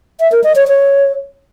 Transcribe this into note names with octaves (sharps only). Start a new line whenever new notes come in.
E5
A#4
D#5
C#5
C#5